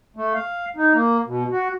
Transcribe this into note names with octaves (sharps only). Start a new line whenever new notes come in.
A3
F5
D#4
A#3
B2
F#4